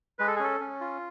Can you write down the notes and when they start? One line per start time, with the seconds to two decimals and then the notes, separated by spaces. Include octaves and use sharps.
0.19 G#3 B4
0.27 A4
0.36 G#4
0.40 C#4 A4
0.60 C#4
0.81 F4